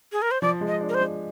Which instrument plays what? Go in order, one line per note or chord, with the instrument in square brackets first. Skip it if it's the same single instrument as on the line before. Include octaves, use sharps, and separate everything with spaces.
[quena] G#4
A#4
C5
[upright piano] F3 [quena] D5
[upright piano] G#3
[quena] D#5
[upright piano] D4
[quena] A#4
C5
[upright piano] G#3